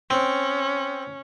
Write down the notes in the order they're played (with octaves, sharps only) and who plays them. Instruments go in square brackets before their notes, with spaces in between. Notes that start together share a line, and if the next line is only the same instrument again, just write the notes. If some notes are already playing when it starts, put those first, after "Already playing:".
[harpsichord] C4 [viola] C#4